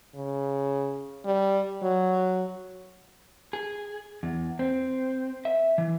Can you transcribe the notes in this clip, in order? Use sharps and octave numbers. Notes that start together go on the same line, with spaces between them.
C#3
G3
F#3
G#4
E2
C4
E5
E3